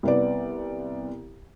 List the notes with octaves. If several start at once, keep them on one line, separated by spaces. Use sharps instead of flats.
C2 B3 D5